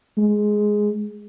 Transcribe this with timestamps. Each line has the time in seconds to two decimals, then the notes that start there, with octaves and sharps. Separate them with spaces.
0.18 G#3